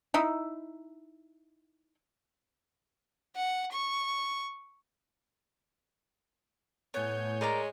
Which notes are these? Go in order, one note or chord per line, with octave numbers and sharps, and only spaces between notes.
D#4 E4
F#5
C#6
A2 B3 C#5 G#5 G6
G#3 A#4 D5 A#5